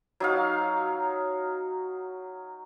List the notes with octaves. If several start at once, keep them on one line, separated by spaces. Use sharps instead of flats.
F#3 D#4 F5